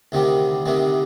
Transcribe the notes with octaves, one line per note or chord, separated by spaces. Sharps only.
D2 C3 D#3 G3
D2 C3 D#3 G3